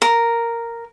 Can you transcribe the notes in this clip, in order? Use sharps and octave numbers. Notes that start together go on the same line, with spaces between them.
A#4